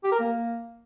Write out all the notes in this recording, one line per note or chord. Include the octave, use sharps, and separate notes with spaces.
G4
A#4
A#3